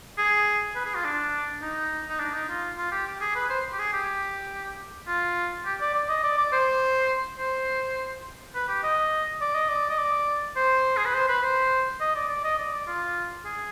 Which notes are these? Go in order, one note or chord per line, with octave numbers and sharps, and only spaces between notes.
G#4
B4
G#4
F4
D4
D#4
D#4
D4
D#4
F4
F4
G4
G4
G#4
B4
C5
G4
G#4
G4
F4
G4
D5
D5
D#5
D5
D5
C5
C5
B4
G4
D#5
D5
D#5
D5
D#5
D5
C5
G#4
B4
C5
B4
C5
D#5
D5
D5
D#5
D5
D5
F4
G#4